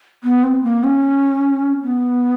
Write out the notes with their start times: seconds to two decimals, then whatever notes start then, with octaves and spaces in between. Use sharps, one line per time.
0.24 B3
0.43 C4
0.63 A#3
0.84 C#4
1.83 B3